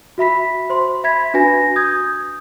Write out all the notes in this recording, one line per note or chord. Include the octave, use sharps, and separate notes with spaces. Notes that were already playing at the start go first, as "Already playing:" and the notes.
F#4 E5 B5 B6
C5 C6
E5 B5 G#6 B6
D4 F#4 B4 G#5 A#6
D#6 G6 G#6